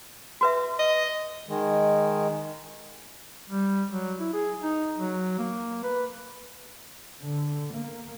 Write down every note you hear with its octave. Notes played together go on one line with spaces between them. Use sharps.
F#4 B4 E5
D#5
D#3 G#3
G3
F#3
E4
G#4
D#4
F#3
A#3
B4
D3
A#3